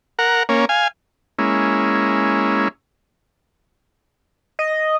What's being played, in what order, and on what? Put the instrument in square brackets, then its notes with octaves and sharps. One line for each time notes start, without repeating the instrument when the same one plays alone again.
[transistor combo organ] A#4 F#5
A#3 C#4
F5 G#5
G#3 A#3 C#4 E4
[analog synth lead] D#5